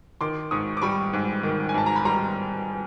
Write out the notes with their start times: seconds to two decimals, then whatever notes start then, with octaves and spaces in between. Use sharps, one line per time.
0.21 D#3 C6 D6
0.51 G#2 C#6 D#6
0.77 D6
0.82 G3 B5 C#6
1.13 G#2
1.43 D#3
1.69 G#5
1.74 G#2 A5
1.86 A#5
1.96 B5
2.05 G3 A#5 C6